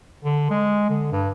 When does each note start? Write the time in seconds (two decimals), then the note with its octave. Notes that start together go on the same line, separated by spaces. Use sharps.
0.25 D3
0.50 G#3
0.89 D3
1.12 G2